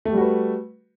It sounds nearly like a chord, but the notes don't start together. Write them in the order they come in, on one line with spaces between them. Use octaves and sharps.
A3 G4 G3 F#4 B4